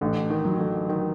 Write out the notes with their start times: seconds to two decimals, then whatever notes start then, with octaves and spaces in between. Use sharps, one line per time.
0.01 A1 D3
0.30 D#3
0.45 F#3
0.60 D3
0.89 D#3